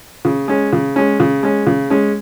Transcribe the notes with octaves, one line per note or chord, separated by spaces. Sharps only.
C#3
G#3 C#4
C#3
G#3 C#4
C#3
G#3 C#4
C#3
G#3 C#4